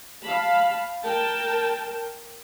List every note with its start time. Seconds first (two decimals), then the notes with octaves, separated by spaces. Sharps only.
0.22 F5 A5 B5
1.04 A#4 G5 A5